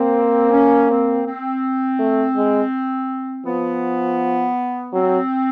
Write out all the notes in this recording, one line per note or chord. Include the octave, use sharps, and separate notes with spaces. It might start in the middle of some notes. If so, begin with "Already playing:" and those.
Already playing: A#3 C4
C#4
C4
C4
A3
G#3
F3 B3
F#3 C4